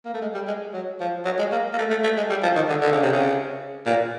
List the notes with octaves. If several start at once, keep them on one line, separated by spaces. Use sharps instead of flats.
A#3
A3
G#3
G3
G#3
F#3
F3
F#3
G#3
A#3
A#3
A3
A3
A3
G#3
G3
F3
D#3
D3
D3
C#3
C3
C#3
A#2